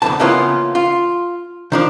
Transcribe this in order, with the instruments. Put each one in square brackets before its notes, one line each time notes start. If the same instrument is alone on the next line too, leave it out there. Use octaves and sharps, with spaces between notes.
[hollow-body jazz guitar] C2 F#2 D3 F3 B3 A5
C#3 E3 A#3 B3 C#4 F4
F4
D#3 F3 D4